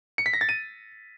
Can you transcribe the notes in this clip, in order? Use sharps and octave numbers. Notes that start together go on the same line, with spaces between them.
C#7
B6
A#6
A6
D#7